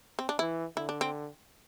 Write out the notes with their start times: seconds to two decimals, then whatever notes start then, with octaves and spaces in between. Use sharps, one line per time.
0.19 C4
0.29 D4
0.39 E3 E4
0.76 D3 E4
0.89 D4
1.01 C4